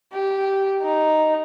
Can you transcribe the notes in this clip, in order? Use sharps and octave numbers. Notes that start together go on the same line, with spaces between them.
G4
D#4